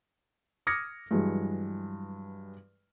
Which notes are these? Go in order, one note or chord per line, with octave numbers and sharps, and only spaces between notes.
D6 D#6 F6 G#6 A#6 C#7
G2 E3 F#3 G#3